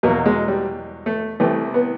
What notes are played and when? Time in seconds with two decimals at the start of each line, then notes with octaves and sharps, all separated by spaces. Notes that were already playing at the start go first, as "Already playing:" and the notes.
0.03 E2 B2 F#3 A#3
0.26 G#3
0.48 G3
1.06 A3
1.40 C2 C3 E3 A3
1.74 B3